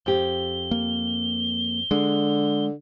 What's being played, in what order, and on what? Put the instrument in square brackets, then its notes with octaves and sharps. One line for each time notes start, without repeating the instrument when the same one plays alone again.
[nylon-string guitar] F2 G4 [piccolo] G7
[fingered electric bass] A#3
[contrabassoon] D3 [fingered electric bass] G#3